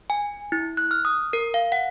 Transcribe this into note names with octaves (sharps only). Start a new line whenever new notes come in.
G#5
E4
F#6
F6
D#6
A#4
F5
F#5